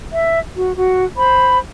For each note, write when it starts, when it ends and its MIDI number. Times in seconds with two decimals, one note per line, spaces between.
0.12 0.40 76
0.56 0.74 66
0.76 1.04 66
1.17 1.59 72
1.17 1.59 83